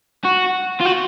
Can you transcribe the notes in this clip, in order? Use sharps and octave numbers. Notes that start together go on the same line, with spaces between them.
F#4
F4
F#4